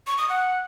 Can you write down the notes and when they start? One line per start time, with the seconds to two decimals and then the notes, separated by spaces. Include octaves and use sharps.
0.07 C#6
0.18 D#6
0.29 F#5